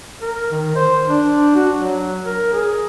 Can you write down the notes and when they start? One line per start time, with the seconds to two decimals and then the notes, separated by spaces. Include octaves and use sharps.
0.22 A#4
0.51 D#3
0.75 C5
1.10 D4
1.55 F#4
1.76 F#3
2.25 A#4
2.53 G#4